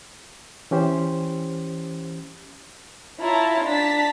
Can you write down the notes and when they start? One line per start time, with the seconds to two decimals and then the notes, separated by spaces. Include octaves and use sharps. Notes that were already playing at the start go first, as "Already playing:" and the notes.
0.71 E3 C#4 G4 C5
3.21 E4 F4 C#5 A5 A#5
3.65 D4 A5 A#5 B6